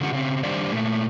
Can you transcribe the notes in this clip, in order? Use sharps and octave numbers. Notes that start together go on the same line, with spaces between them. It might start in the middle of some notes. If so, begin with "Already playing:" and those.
D3 C#4 D4 F4 G4 F#5
C#3 C4
D#3 G3 D4 G4 C5 D5
A#2 A3